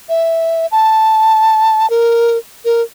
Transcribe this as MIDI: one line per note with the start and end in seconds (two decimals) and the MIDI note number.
0.09 0.66 76
0.72 1.89 81
1.90 2.38 70
2.65 2.82 70